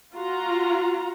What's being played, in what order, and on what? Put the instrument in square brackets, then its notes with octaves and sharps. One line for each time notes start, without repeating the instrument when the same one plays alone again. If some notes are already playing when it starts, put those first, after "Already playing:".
[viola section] F4 F#4 A#5